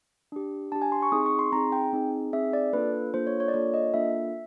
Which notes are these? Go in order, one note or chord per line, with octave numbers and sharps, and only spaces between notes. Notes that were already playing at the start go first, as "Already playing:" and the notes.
D4 G4
D4 G4 A5
G#5
C6
C#6
C4 D#4 G#4 D#6
C#6
C6
C4 D#4 G#4 A#5
G5
C4 D#4 G#4
C4 D#4 G#4 E5
D5
A#3 D4 F4 A4 B4
A#3 D4 F4 A4 C5
C#5
C#5
D5
A#3 D4 F4 A4 C#5
D#5
A#3 D4 F4 A4 E5